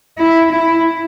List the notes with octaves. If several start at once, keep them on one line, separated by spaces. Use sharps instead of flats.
E4
E4